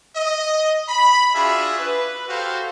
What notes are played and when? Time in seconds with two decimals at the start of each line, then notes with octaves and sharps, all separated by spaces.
0.15 D#5
0.88 B5
1.35 D4 F4 F#4 G#4 E5
1.79 B4
2.28 F#4 G4 A4 C5 F5